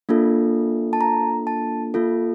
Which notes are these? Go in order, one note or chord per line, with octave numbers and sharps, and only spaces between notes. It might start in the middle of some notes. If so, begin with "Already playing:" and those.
A#3 D4 F4 A4
A5
A#5
A5
A#3 F4 A4